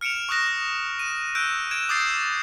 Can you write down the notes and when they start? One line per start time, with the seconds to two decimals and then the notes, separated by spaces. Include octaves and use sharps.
0.01 F6 C#7 D7 E7 F7
0.29 C#6 D#6 F#6 A#6 E7
0.99 D#7
1.35 E6 F#6 G6 D7
1.71 G#6 D7 E7
1.89 D6 D#6 G6 A6 C7